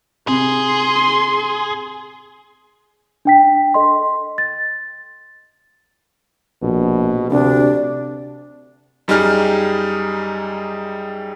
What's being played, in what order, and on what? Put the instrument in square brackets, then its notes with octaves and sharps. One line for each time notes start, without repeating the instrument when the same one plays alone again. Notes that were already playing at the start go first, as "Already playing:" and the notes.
[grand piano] C3 [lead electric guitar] G#4 [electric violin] C6
[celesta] D4 G5 B6
A4 D#5 C6
A6
[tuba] A#1 [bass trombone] B2
[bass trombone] D2 [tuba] C3 [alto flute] D4
[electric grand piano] F#2 G3 D#4 G#4 F6